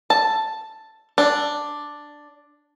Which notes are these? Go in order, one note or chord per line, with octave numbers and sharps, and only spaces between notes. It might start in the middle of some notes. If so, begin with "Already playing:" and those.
A5
D4